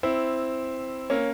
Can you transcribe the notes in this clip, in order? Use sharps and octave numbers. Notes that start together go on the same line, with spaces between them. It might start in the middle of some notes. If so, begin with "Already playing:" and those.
C4 E4
A#3 C#4